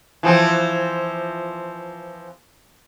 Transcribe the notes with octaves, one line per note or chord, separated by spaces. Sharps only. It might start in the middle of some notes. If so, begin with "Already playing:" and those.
E3 F3 C4